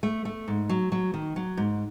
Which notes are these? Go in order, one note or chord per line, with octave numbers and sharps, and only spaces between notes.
A3
A3
G#2
F#3
F#3
D#3
F#3
G#2